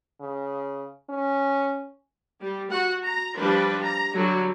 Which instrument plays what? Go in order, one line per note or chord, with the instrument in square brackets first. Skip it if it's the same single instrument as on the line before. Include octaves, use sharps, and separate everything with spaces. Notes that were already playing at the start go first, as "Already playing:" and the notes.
[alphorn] C#3
C#4
[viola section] G3
F#4 F#5
A#5
F3 G3 D4 B4
A#5
D3 F#3 G3 F#4